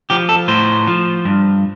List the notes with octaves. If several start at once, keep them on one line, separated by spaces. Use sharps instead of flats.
F3 G4
A4
A2 C5
F3
G2